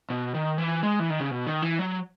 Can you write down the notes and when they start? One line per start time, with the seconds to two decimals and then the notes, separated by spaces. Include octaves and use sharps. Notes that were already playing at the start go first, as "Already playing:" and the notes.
0.10 B2
0.34 D#3
0.58 E3
0.83 G#3
0.99 E3
1.10 D#3
1.20 C#3
1.31 B2
1.47 D#3
1.62 E3
1.79 F#3